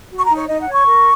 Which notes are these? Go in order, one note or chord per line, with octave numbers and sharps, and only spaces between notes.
F#4
C#6
A#5
D#4
C#5
D#4 D#5
F#5
C#5
C#6
A#4